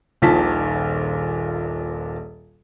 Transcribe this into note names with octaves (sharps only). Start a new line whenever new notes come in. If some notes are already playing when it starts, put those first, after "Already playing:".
D#1 A#1 A#2 D#3 A5 B6